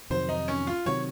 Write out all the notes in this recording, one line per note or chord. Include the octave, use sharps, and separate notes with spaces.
F2 C3 D#3 F#3 C5
D#4
C#4
F4
C3 D#3 F#3 C#5